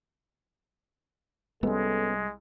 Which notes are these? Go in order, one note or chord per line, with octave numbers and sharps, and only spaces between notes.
C2 G#3 B3 C#4 A4